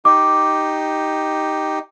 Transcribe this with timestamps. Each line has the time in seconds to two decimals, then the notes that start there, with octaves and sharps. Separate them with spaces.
0.05 D#4 G4 D6